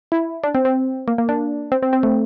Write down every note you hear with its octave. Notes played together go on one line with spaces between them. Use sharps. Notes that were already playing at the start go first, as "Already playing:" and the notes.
E4
D4
C4
C4
A#3
A#3
D4
C4
C4
C4
A3